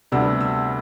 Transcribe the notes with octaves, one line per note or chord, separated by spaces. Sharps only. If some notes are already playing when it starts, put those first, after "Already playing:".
D2 C3 G3 B3 E6
E6